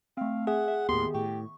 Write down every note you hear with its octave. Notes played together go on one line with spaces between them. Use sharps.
A3 C4 F5
G#4 E5 F#5
E5
D#2 A2 D#3 B3 G4 C6
A2 G4 C#6